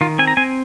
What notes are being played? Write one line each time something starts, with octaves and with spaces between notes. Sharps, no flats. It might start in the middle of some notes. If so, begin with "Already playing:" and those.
D#3 F4
C4 G#5
A#5
C4 G#5